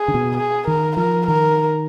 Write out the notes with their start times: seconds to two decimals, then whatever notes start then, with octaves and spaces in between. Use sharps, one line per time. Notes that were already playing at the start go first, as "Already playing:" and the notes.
Already playing: G#4
0.08 D3
0.14 B2
0.37 G#4
0.67 D#3 A#4
0.97 F3 A#4
1.27 D#3 A#4